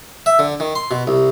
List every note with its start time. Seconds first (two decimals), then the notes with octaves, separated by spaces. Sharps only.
0.26 E5
0.39 D3
0.60 D#3
0.75 C6
0.91 B2
1.07 C2